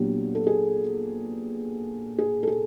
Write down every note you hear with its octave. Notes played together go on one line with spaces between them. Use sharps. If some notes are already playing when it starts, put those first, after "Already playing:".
Already playing: A#2 F#3 B3 D4 G4
A4
G#4
G#4
A4
G#4